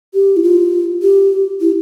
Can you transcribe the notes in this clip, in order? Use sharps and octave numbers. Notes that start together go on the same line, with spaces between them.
G4
E4
F4
G4
E4